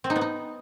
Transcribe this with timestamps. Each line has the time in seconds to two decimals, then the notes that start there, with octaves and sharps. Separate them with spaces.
0.04 C4
0.10 D#4
0.16 B3
0.21 D#4